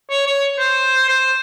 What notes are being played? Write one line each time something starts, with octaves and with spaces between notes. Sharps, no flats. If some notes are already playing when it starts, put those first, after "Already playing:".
C#5
C#5
C5
C5